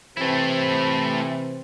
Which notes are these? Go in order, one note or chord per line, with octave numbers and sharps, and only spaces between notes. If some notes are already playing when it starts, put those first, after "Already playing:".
C3 E3 A3 C4 E4